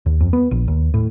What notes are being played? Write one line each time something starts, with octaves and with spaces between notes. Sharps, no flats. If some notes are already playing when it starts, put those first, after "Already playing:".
D#2
F2
B3
A#1
D#2
A2